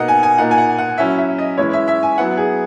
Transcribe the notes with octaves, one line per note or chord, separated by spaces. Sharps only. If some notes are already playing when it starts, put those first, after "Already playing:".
Already playing: B2 A#3 D#4 D#5 F#5
G#5
G#5
A#2 A#3 D#4 F#5
G#5
F#5
F#5
F#3 C#4 E4 E5
E5
D#5
E3 G#3 C#4 E4 C#5
E5
E5
G#5
F#3 B3 E4 F#5
G#4